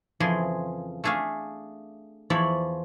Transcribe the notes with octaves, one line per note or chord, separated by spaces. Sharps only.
F2 C#3 E3 F3 G#4 C6
A3 D4 G#4 E5 F5
E2 F3 C#5 D5 E5 B5